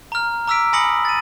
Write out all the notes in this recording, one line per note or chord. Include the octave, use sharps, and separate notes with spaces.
A#5 F6
A#5 D6 E6 F6 B6 D7
G#5 B5 D#6 A#6 C#7 F#7
A6 D#7